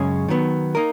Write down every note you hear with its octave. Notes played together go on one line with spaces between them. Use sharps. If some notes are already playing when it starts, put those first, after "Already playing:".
Already playing: F#2 C#3 G#3 C#4 G#4
D#3 F#3 B3
A#3 D#4 A#4